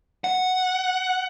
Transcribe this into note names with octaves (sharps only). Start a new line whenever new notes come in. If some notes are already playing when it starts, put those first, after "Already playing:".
F#5